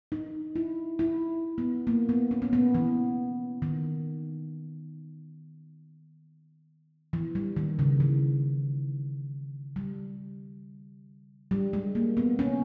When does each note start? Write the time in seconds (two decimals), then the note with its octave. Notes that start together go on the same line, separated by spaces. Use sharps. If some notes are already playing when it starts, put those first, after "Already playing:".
0.12 D#4
0.56 E4
0.99 E4
1.58 B3
1.87 A#3
2.09 B3
2.31 C#4
2.42 C#4
2.53 B3
2.75 E3
3.62 D#3
7.13 E3
7.35 G3
7.56 D#3
7.79 C#3
8.00 E3
9.76 G3
11.51 G3
11.73 G#3
11.95 A#3
12.17 B3
12.39 C#4